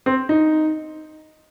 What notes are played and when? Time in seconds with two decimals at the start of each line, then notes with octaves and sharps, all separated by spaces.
0.06 C4
0.29 D#4